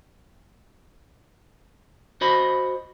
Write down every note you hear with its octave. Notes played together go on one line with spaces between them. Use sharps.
F#4 C5 D#5 B5